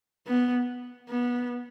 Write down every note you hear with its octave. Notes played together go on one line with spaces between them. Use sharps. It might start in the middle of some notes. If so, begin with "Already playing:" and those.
B3
B3